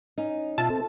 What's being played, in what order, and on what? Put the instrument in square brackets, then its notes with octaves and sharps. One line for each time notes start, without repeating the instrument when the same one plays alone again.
[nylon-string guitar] C#4 D#4
[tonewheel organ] B2 F4 E5 [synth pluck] A5
[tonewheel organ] C4 A4